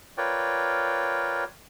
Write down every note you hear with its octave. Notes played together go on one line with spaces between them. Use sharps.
F4 A#4 B4 C#5 D5 G5